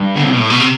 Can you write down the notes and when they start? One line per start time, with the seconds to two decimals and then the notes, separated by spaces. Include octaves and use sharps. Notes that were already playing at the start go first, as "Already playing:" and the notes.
Already playing: G2
0.16 D3
0.23 C3
0.32 B2
0.40 A2
0.50 B2
0.60 C3